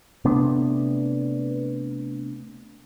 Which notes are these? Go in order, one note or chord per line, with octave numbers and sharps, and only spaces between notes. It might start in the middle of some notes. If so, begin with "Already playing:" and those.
C3 A3 B3 D4